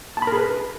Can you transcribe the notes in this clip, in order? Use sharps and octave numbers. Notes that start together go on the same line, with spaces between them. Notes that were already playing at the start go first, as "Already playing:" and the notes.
A5
B5
A#4
G#4
B4